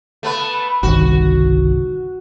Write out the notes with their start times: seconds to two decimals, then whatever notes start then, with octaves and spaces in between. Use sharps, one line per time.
0.23 A3 B3 B4
0.83 G1 C2 D#3 F#4